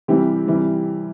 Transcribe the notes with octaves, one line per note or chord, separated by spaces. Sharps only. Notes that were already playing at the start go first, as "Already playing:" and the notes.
C3 E3 G3 G4
C3 E3 G3